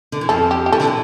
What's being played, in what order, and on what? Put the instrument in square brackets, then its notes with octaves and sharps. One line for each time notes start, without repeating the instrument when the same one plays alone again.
[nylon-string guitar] D3
E3
[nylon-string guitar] F2 F3 [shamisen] A4
[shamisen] G4
G4
[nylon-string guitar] E3 [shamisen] A4
[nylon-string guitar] D3
E3